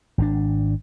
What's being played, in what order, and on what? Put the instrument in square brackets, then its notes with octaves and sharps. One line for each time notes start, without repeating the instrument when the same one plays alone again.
[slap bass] G#1 D#3 D4